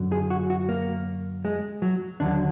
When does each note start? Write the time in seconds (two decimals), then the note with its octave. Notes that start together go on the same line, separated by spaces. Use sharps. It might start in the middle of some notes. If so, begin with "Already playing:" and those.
Already playing: F#2 D3 F#3
0.12 G#4
0.30 F#4
0.50 F#4
0.69 A#3
1.45 G#3
1.82 F#3
2.20 D#2 D3 F#3 D4